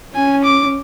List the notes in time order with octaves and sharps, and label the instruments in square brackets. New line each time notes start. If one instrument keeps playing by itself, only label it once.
[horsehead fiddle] C#4 [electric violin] G#5
[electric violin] D6